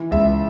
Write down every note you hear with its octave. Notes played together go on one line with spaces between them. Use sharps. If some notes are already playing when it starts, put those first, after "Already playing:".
Already playing: E3
C#2 E5